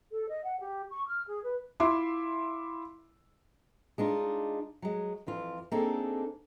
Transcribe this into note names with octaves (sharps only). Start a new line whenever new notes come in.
A4
D#5
F#5
G4
C#6
F6
G#4
B4
E4 F4 E5 C6 D6
G#3 D4 D#4 F4
F#3 G#3
F2 E3 F4
A#3 C4 D4 D#4 G#4 A4